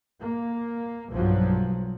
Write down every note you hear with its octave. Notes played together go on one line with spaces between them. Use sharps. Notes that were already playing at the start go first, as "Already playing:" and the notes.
A#3
B1 G2 F3 F#3